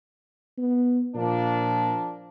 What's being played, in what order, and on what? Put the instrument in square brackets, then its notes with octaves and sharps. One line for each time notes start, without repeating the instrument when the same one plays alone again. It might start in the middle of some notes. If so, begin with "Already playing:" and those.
[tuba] B3
[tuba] A#2 [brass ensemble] F3 A#3 D4